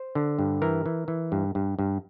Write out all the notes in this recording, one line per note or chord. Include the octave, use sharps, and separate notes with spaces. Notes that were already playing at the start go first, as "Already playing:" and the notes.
Already playing: C5
D3
G2
E3 A#4
E3
E3
G2
G2
G2